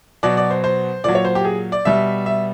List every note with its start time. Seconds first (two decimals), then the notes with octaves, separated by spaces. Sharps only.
0.23 B2 F#3 D5
0.37 D5
0.51 C5
0.64 C5
1.04 A#2 F#3 D5
1.15 C#5
1.25 C5
1.35 G4
1.45 G#4
1.72 D5
1.85 B2 G3 E5
2.26 E5